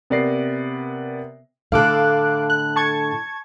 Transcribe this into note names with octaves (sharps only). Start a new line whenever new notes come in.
C3 B3 A#4 D5 A#6 C7
A2 D3 A4 F5 D6 F#6
F#6
A5 C#6 G#6